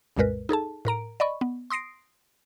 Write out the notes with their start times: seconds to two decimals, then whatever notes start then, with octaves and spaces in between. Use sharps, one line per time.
0.17 C2 F#2 A#2 G#3 A#4 B4
0.49 D#4 G#4 A4 A5
0.85 A2 A#4 A#5 D7
1.20 D5 D#5 B5 C#6
1.41 B3
1.70 C6 D#6 A#6 C7 D7